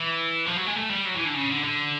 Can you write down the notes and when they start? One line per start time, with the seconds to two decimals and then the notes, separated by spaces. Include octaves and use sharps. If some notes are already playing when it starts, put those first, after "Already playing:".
Already playing: E3
0.46 F3
0.56 F#3
0.66 G#3
0.76 A3
0.90 G3
1.05 F#3
1.15 E3
1.25 D3
1.34 C#3
1.50 D3
1.64 D3